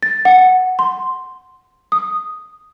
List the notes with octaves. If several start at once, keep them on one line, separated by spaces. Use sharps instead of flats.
A6
F#5
C6
D#6